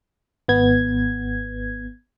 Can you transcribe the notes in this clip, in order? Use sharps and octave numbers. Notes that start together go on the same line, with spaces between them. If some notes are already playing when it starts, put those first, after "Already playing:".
G#1 B3 G#6